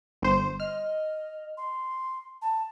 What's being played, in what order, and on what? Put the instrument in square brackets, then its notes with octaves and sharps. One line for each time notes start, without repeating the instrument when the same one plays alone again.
[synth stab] G1 C5
[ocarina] D#5 [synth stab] F6
[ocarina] C6
A5